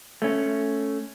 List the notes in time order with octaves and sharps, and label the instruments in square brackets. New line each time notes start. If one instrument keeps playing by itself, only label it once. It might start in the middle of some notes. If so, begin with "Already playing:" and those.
[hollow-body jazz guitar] A3 C#4